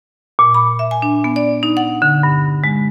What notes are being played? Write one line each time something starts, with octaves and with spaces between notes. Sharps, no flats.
A#2
B5
E5
G#5
D4
B3
D5
D#4
F#5
D3
G2
G#3